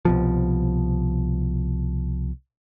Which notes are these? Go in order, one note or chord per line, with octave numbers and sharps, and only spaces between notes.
C2 B2 F3